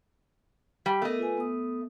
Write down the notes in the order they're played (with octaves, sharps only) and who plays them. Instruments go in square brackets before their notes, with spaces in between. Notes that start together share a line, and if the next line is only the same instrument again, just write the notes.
[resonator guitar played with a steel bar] G3
[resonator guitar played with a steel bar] A3 D#5 [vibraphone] B3 A#4
[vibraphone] F4 B4 G#5
B3 D#6